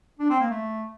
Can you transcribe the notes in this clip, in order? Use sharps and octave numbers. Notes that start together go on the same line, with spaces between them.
D4
C4
A#3
A3